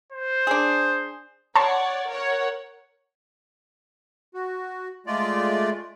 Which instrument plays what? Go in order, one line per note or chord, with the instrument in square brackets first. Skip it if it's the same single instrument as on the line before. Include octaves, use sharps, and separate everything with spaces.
[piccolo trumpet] C5
[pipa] D4 G#4
[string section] C#5 D5 F#5 [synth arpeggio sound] A5 A#5 C6
[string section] A#4 C#5 F#5
[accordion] F#4
G#3 A3 F4 D5